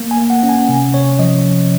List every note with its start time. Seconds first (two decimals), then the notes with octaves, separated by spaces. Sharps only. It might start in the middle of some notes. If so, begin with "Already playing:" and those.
Already playing: A#3
0.11 G#5
0.17 A#3
0.30 F#5
0.43 C#4
0.49 G#5
0.69 C3
0.94 C3 C#5
1.19 F3 D#5